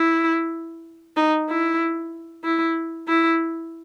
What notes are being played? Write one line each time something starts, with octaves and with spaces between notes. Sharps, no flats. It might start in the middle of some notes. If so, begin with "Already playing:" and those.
Already playing: E4
D#4
E4
E4
E4